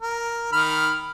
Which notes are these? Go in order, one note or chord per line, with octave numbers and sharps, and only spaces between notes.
A#4
D#3 B5 F6